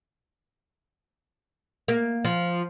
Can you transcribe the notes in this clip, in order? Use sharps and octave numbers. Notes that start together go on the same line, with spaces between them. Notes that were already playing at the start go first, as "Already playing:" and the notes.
A#3
F3